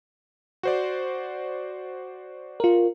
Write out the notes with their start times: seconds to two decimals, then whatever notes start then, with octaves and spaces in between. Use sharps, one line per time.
0.63 F#4 C5 D5
2.60 F4 A#4